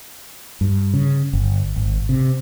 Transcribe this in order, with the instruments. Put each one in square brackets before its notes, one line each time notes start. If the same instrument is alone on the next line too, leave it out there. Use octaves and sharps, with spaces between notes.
[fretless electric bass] G2
C#3
G1
G#1
C3